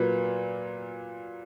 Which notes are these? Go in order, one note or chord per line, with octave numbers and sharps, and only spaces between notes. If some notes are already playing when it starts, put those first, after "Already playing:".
Already playing: A#2 F#3 A#3 F4 B4